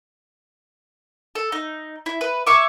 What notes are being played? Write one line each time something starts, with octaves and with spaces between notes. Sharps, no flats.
A4
D#4
E4
B4
C#5 E5 C#6 D6